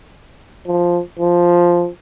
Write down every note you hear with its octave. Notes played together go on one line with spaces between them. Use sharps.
F3
F3